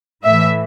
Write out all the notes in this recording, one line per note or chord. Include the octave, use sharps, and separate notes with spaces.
A2 E3 E5